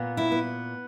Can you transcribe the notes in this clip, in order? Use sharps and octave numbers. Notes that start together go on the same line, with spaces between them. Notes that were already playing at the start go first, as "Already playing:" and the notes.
Already playing: A#2 B3
E4
B3